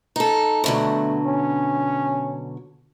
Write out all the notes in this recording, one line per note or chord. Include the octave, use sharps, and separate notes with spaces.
D#4 A4
B2 D3 F#3 A3
C#4